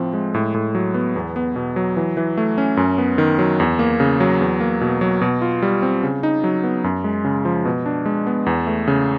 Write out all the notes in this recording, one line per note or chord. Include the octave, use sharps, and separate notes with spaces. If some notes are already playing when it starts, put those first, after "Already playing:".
Already playing: A2 F3 C4
G#3
A2
A2
F#3
B3
E2
B3
B2
F#3
E3
E3
A3
C#4
F#2
B3
D#3
F#3
E2
A#3
C#3
F#3
E2
A#3
B2
F#3
B2
F4
G3
C4
C#3
D#4
F#3
B3
F#2
G#3
C#3
F3
B2
D4
G#3
B3
E2
A3
C#3